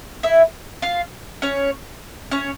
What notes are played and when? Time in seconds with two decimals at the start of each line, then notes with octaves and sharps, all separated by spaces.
0.23 E4 E5
0.82 F4 F5
1.42 C#4 C#5
2.31 C#4 C#5